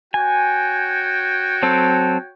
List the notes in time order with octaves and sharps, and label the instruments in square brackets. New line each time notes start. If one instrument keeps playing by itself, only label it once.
[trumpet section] F#4 C#5 G5 [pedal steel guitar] G#5
[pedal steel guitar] F#3 C4 A4